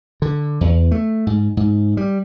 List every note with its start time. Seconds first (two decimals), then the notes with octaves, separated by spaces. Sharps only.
0.22 D3
0.61 E2
0.91 A3
1.27 G#2
1.57 G#2
1.97 G3